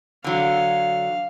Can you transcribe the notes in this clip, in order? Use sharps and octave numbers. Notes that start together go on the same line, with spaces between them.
D3 F#3 F5